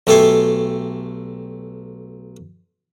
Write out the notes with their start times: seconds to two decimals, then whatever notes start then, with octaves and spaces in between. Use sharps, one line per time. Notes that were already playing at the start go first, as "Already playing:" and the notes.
0.07 B1 A3 G4 A4 G#5 C6